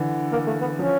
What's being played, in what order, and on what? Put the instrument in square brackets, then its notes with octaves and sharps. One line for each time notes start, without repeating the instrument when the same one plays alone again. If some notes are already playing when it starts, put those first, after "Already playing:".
Already playing: [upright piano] D3 E3
[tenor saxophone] A#3
A3
B3
[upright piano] F3 [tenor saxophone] C#4